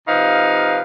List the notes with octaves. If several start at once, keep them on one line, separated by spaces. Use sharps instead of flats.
C3 F3 D#4 B4 F5